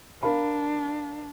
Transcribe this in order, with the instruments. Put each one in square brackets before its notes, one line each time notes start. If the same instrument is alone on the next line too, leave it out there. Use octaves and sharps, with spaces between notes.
[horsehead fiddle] D4 [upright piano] A#4 F5 B5